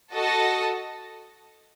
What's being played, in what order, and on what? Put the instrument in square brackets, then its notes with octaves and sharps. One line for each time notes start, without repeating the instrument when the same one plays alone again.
[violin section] F#4 A4 D#5 A5